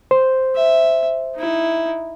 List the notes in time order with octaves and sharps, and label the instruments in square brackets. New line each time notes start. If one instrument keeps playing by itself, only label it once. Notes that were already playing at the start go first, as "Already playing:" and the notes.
[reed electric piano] C5
[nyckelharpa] E5
D#4 E4